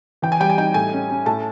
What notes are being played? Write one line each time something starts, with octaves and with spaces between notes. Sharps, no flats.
E3 G5
G#5
G3 G5
G#5
D#4 G5
A2 G#5
C#4
C#4
A2 A5